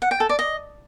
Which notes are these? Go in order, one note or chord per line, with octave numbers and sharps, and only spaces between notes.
F#5
G5
A4
D5
D#5